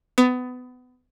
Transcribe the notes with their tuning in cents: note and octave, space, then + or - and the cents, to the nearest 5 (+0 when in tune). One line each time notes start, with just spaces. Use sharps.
B3 +25